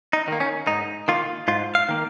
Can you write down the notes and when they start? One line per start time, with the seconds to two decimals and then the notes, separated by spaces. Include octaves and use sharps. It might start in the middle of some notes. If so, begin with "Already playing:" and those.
0.13 D#4
0.28 D#3 A#3
0.40 C#4
0.67 G#2 D#4
1.08 D#3 A#3 F4
1.48 G#2 F4
1.75 F5
1.89 D#3 A#3